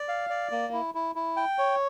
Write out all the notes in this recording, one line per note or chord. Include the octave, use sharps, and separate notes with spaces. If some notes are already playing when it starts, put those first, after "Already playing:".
Already playing: D5
F5
D5
A#3
E4
E4
E4
G5
C#5